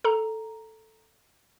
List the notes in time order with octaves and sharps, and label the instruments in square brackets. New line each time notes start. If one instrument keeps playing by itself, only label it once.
[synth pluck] A4 A#5